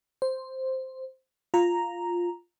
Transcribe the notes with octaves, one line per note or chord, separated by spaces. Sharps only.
C5
F4 A#5